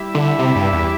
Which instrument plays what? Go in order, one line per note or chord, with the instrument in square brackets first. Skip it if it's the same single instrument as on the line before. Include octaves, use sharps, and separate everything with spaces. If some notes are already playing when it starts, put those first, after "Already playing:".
Already playing: [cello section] G3 E4 G4 E5
[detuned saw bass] D3
C3
G2
E2